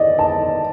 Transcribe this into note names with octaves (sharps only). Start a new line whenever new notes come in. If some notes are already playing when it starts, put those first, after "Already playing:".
Already playing: D5 D#5
A5